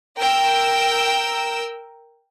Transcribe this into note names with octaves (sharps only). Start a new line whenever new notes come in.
A#4 G5 E6